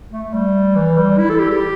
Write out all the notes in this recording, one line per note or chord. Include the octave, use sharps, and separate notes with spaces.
A3
G3
E3
G3
E4
A4
G4
G4